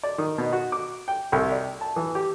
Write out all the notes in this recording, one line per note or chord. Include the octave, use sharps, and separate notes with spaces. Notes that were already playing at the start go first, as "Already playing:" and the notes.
D5
D#3
B2
F#4
D6
G5
C2
D5
A5
E3
G4